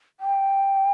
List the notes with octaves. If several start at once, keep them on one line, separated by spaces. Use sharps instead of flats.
G5